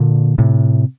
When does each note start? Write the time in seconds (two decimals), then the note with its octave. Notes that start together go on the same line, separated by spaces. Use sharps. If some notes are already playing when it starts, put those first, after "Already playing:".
Already playing: A#2 D3
0.38 A2 C3